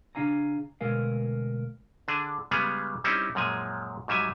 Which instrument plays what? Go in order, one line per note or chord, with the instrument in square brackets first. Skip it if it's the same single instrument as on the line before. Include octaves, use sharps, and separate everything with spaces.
[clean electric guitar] C#3 A#3 D4 F5 G#5 A#5
D2 B2 G#3 A#4 F5 G#5
[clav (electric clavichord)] D3 D4 G#4
C#3 G3 G#3 B3 G#4
G3 C4 C#4 D#4 E4
F#2 A#2 F3 G#3 G#5
G#2 F#3 G3 E5 G#5